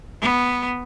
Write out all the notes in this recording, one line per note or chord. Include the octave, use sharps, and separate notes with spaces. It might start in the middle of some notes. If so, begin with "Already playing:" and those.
B3